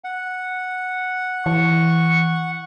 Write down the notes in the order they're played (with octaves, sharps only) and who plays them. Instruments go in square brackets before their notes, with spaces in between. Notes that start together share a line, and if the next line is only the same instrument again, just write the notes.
[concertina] F#5
[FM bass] E3 [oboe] C#6